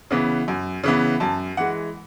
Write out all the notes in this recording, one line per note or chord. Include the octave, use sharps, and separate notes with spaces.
C#3 E3 B3
F#2
C#3 E3 B3
F#2 A5
E3 G#3 F#5